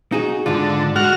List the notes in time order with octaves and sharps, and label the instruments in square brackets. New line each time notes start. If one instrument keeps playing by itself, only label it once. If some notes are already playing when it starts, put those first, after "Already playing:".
[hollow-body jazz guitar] D#4 F#4 G#4
[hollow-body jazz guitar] G#2 F4 [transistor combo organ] D3
[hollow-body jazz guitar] G#3 [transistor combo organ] F#4 F6